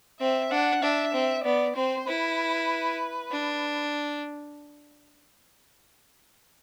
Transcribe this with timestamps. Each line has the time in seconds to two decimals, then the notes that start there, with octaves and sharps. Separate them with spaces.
0.20 C4 E5
0.51 D4 F#5
0.82 D4 E5
1.13 C4
1.44 B3 D5
1.76 C4 C5
2.07 E4 B4
3.31 D4